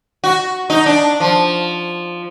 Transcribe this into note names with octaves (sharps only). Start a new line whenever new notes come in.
F#4
D#4
D4
F3